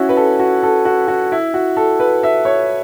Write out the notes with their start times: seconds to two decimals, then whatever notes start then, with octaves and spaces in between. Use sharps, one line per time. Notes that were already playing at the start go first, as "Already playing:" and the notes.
Already playing: C#4 E4 F#4
0.09 B4
0.17 A4
0.39 F#4
0.63 A4
0.85 F#4
1.08 F#4
1.32 E4
1.54 F#4
1.77 A4
2.00 B4
2.23 E5
2.45 C#5